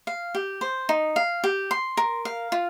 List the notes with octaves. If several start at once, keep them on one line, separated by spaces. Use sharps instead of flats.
F5
G4
C5
D#4
F5
G4
C6
A#4
F5
F4